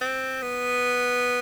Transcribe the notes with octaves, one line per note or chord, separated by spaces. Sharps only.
C4
B3